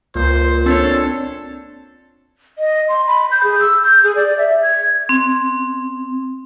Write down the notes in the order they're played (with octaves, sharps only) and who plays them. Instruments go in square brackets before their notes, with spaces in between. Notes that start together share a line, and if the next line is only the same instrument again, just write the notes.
[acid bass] C#2 [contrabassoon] A#2 [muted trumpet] C5
[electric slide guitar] C4 D4 C#5 [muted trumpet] A4
[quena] D#5
C6
B5
G6
G#4
E6
G6
G#4
D5
E5
G#6
[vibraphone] C4